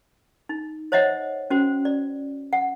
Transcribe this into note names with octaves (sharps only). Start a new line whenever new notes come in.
D#4
C5 C#5 D#5 E5 F#5
C#4 F#4 C5
D5
F#5